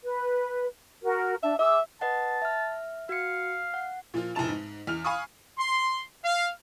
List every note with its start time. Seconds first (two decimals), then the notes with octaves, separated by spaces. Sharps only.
0.03 B4
1.04 F#4 A#4
1.43 D4 E5 A5
1.59 G#4 E5 D6 E6
2.01 B4 D#5 F#5 A5
2.42 E5 F6
3.09 F#4 F5 C#7
3.74 F#5
4.14 A#2 F3 F4
4.35 F1 A2 F3 A5 F7
4.49 G#2
4.87 E2 F6 F7
5.04 F5 G#5 B5 C#6 D#6
5.58 C6
6.24 F5